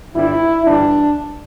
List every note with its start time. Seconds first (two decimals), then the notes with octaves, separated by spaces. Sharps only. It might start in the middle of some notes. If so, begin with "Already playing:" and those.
0.14 G1 G2 G3 E4
0.66 G1 G2 E3 G3 D4